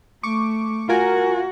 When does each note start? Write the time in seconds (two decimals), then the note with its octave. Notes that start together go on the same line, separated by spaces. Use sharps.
0.23 A3 C#6 D6
0.89 F4 F#4 A#4 G#5